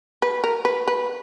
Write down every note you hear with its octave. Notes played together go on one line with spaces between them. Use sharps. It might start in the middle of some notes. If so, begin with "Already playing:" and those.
B4
A#4
B4
B4